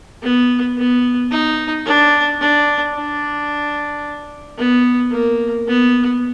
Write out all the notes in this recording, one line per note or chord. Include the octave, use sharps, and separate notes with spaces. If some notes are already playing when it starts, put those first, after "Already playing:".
B3
B3
D#4
D4
D4
D4
B3
A#3
B3